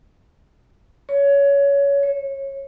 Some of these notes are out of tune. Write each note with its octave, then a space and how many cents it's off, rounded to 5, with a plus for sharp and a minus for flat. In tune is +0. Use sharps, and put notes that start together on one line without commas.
C#5 +20
C#5 -20